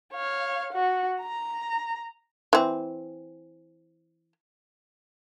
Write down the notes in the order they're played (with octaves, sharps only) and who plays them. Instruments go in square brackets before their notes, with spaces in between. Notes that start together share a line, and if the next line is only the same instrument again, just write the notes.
[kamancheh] C#5 F5
F#4
A#5
[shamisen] E3 C4